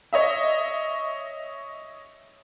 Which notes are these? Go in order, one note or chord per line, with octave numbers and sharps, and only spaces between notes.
C#5 D#5 E5